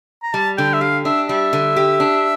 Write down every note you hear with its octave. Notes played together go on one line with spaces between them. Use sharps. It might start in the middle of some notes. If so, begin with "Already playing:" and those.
A#5
G3 A5
D3 G5
E5
G4 F5
D4 E5
G3 E5
D3
G4
D4